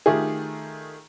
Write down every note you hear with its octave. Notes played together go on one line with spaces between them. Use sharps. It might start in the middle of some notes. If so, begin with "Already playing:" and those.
D#3 A3 F4 G4 G#4